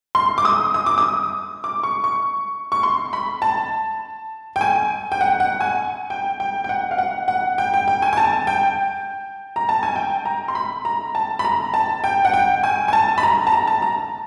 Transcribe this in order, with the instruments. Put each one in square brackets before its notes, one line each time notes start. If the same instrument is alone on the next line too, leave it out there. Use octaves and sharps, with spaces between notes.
[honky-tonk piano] C6
D6
D#6
D#6
D6
D#6
D6
C#6
C#6
C#6
C6
B5
A5
G5
G#5
G5
F#5
F#5
G#5
G5
G5
G5
F#5
F5
F#5
F#5
G5
G5
G5
G#5
G#5
A5
G5
A#5
A5
G#5
G5
A#5
C6
B5
A#5
A5
B5
A#5
A5
G5
F#5
G5
G#5
G#5
A5
B5
A#5
A5
A#5
A5
A#5